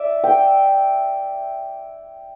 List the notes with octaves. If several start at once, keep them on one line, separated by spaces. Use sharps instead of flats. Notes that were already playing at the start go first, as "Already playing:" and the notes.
Already playing: D5 E5
G5